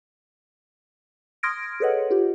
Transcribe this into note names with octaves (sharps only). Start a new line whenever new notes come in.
C6 D#6 F6 G#6 A#6 D7
G#4 A4 B4 C#5 D#5 F#5
F4 G4